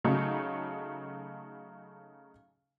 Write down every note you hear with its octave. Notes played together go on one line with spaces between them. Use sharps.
C#3 F#3 A3 D#4